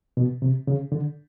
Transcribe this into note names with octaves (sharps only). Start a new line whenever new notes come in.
B2
C3
C#3
D3